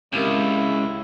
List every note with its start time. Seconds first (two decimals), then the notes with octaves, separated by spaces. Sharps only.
0.13 C#2 C4 E4 G4 A#4